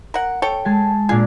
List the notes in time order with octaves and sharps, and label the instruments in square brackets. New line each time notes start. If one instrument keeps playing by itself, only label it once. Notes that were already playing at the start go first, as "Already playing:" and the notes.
[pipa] A#4 F#5
A4 C#5 G5
[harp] G#3 G#5 A5
[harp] A#2 D4 F4 [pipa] G#4